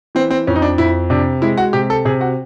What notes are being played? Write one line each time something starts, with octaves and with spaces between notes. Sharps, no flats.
E3 C4
C4
F2 C#4
D#4
D4
F2 E4
C3 D4
G#3 E4
F#4
C3 G4
A4
C3 G#4
F#4